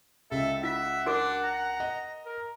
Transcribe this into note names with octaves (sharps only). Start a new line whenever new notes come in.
C#2 C#3 A4 E5
F4 E5 F#5
D4 F#4 A#4 D6
A#5
D#5
A#4